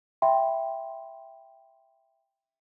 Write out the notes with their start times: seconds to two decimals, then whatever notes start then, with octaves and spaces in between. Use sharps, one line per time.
0.22 E5 G5 B5 C6